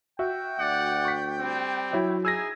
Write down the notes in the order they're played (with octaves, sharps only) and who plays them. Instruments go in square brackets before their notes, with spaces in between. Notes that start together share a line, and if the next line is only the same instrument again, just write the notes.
[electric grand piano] F#4 E5 [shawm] G5
[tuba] D2 [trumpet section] D5 F#5
[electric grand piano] C#6 B6
[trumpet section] G3 C4
[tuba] F#3 [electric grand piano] E4 C#5 E5
[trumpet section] D#4 G#4 [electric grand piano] E6 G#6 A#6